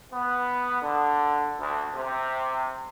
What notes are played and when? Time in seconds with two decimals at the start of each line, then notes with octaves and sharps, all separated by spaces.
0.12 B3
0.82 D3
1.59 D2
1.95 C3